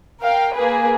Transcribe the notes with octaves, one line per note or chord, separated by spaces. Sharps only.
A#4 F5 G5
A#3 G#4 B4